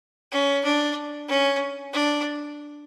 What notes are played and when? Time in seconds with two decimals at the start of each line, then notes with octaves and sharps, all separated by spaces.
0.32 C#4
0.64 D4
1.28 C#4
1.94 D4